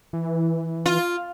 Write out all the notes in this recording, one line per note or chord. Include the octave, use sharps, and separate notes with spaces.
E3
F4